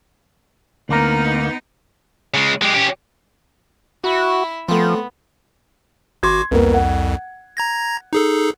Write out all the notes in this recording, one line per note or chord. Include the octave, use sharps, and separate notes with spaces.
D2 A#3 B3 D#4 A#4
C#3 G#3
G#3 G4
C#4 G4
E4 F#4 E5
F3 A3 B3 C4
G#1 F#4 C6 D6 G#6
C2 F2 A#3 B3
F#5
A#5 G#6 A#6
D#4 G#4 A4